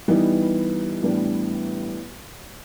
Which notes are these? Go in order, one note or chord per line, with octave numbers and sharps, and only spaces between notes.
E3 G3 B3 D#4
A2 E3 G3 B3 D4